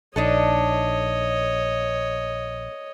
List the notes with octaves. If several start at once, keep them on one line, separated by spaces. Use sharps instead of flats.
A#1 D4 D#4 A4 C#5 D#5